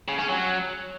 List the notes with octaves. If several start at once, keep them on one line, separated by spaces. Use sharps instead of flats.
C#3
C#4
F#3